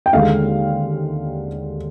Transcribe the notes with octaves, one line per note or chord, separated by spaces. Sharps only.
G5
D#2 D3 G#3 F5